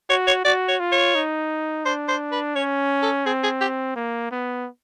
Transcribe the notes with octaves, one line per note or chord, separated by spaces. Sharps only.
F#4 C#5
C#5
F#4 D5
C#5
F4
C#5
D#4
D4 C5
C5
B4
C#4 C#5
A4
C4 G#4
G#4
G4
A#3
B3